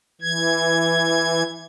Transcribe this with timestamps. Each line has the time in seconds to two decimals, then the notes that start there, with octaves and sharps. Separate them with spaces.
0.21 E3 G#6